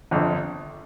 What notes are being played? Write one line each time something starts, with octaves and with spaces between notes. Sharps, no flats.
G1 F2 D3